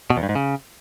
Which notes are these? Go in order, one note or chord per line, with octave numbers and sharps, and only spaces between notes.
B2
E2
G2
G#2
C#3